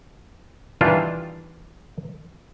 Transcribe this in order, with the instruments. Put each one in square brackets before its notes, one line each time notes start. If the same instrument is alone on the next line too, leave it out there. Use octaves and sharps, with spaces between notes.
[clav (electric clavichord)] D#3 E3 G3 D4 F4